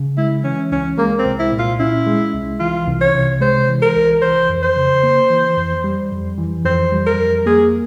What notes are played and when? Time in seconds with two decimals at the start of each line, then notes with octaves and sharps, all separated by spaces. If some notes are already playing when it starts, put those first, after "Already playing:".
Already playing: C#3
0.17 G#3 E4
0.44 E3 C#4
0.72 C#2 C#4
0.98 G#3 A#3
1.19 C4
1.25 C2
1.40 E4
1.52 A#2
1.59 F4
1.80 C#4 E4
2.06 G#3
2.34 C2
2.60 E3 F4
2.87 C2
3.01 C#5
3.14 C3
3.41 G#3 C5
3.68 E3
3.82 A#4
3.96 C2
4.22 E3 C5
4.49 F2
4.63 C5
4.76 C#3
5.03 A#3
5.30 E3
5.57 F2
5.84 G3
6.12 F2
6.38 E3
6.65 F2 C5
6.92 G3
7.06 A#4
7.19 F2
7.46 A#3 G#4